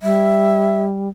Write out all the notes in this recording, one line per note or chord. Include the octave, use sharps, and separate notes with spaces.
G3 E5